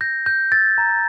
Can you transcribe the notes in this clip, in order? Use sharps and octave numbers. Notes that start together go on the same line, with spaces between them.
G6 A#6
G6
E6 A6
A#5